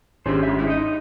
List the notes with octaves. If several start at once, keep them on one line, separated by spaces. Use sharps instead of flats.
G#1 C#4 D4 G4 G#4 C5
G#2 B2 E5
G#3 E4
D#4 D#5